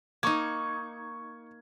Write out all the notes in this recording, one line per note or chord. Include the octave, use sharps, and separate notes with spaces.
A#3 D#4 C#6 G#6